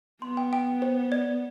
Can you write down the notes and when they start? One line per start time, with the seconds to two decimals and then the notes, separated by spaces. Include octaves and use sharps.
0.22 B3 C6
0.37 G5
0.53 G5
0.82 C5
1.12 D5